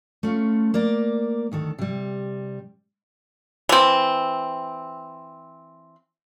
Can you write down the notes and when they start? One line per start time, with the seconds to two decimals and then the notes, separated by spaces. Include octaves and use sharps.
0.23 A3 C#4 F4
0.74 A#3 A#4 D5
1.52 D2 D#3 A4
1.78 C3 G3
3.69 E3 C4